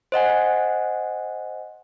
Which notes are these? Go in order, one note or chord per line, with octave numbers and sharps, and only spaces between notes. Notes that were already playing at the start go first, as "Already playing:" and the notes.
C5 D#5 F#5 G#5